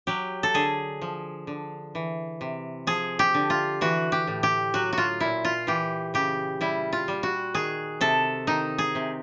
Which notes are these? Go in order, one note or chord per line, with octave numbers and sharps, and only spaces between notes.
F#3 G4
A4
D3 G#4
F3
D3
E3
C3
F3 G#4
G4
D3
F4
E3 F#4
G4
A2
G4
F#3 F#4
F#4
F4
A#2 E4
F4
E3 G4
C#3 G4
G3 E4
F4
G3
F#4
D#3 G#4
C3 A4
D#3 D#4
G#4
C3